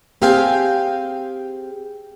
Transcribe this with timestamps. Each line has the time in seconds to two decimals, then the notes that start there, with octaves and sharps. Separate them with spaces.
0.22 C4 G4 G#4 F5 G5 G#5